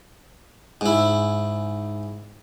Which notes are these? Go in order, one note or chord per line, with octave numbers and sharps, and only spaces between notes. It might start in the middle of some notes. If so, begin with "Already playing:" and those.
G#2 E4